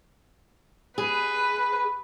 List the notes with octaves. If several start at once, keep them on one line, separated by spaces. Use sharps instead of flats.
G#4 B4